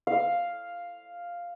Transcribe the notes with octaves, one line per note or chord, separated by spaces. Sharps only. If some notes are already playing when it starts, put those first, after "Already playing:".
F5